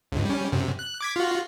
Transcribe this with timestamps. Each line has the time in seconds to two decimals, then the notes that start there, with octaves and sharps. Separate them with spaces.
0.12 C#2 G2
0.25 G3 C#4
0.52 F#2 C3
0.79 F#6
1.01 D6 G#6 B6
1.16 F4 F#4